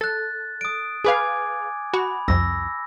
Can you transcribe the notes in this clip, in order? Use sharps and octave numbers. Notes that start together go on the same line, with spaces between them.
A4 F#6 A6
D#6 D7
G#4 B4 F5 G#5 D6 G#6
F#4 B5
C2 F2 E6 A#6